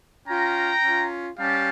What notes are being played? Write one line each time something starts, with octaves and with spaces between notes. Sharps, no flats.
C#4 F4 G5 A#5
C#4 F4
G3 C#4 G4 F5 A5